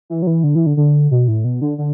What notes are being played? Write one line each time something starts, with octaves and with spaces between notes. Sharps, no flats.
E3
F#3
E3
D3
E3
D3
D3
B2
A2
B2
D3
D3